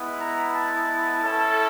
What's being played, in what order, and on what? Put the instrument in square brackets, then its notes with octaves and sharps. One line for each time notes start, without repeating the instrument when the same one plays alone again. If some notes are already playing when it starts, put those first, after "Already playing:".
Already playing: [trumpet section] G#3 B3 E4
[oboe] A#5
A5
[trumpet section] C#4 E4 A4